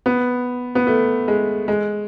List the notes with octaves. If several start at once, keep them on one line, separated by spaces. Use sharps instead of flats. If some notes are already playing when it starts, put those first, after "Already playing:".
B3
B3
A3
G#3
G#3